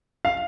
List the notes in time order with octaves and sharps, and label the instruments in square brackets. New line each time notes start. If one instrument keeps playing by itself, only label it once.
[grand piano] F5